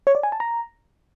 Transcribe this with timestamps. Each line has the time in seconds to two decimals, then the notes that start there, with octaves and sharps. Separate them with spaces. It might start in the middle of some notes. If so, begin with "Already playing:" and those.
0.07 C#5
0.15 D5
0.23 G#5
0.32 A5
0.40 A#5